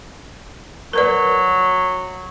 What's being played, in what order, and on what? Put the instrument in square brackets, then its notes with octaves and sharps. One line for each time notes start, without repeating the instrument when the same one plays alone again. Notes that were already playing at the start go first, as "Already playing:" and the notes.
[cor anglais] F#3 [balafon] A#4 B4 D5